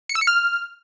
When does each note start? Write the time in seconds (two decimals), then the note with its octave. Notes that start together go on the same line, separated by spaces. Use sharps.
0.09 C#7
0.15 E6
0.21 C#7
0.27 F6